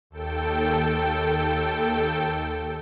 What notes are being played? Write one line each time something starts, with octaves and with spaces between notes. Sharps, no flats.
D#2 A4 G5